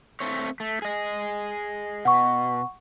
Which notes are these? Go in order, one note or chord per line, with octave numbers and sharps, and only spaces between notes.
A3 C4 C#5
A3
G#4 D#5
B2 F#5 C#6